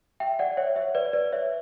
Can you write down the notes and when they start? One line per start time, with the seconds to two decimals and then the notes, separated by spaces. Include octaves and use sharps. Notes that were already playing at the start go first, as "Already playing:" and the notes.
0.20 E5 G5
0.39 D5 F#5
0.57 C#5 E5
0.76 C#5 E5
0.95 B4 D5
1.13 B4 D5
1.32 C#5 E5